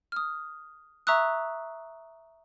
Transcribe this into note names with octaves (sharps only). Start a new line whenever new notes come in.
D#6 F6
E5 A#5 C#6 D#6 E6 F#6